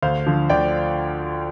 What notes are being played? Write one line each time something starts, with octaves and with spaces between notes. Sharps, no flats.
D2 C5 F5
D3 F3
D2 D5 G5